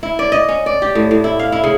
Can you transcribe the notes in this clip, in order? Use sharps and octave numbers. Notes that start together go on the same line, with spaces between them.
E4
D5
D#5
C#4
D5
G4
A2
A2
E4
F5
E4
C#3